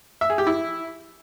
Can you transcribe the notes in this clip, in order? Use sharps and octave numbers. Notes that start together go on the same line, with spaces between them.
E5
G#4
G4
E4